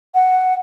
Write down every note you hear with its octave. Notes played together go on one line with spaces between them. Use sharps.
F#5